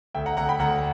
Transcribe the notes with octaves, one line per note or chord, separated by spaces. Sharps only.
D2 E5 G5
F#5 A#5
D2 F#5 A#5
G5 B5
D2 F#5 A#5